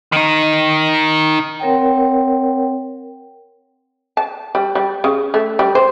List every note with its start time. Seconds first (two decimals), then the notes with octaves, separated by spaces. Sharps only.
0.12 D#3 D#4
1.60 C4 A#4 C#5 F#5 G5
4.17 A5
4.55 G3
4.75 G3
5.04 C#3
5.34 A3
5.59 G3
5.75 C5